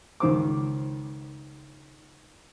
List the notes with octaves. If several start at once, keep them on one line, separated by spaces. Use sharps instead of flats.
C#2 D#3 C5 D6